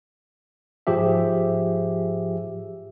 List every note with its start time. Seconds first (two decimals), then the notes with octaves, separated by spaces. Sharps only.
0.87 G#2 F3 G4 G#4 E5